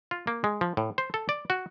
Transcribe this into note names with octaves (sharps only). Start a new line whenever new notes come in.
F4
A#3
G#3
F3
A2
C5
A4
D5
F#4